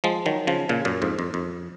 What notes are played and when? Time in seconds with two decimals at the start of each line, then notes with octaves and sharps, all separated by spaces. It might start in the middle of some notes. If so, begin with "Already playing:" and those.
0.04 F3 G#3
0.26 D#3 F#3
0.47 C#3 F3
0.69 A#2 C#3
0.85 F#2 A#2
1.02 F2 G#2
1.19 F2
1.34 F2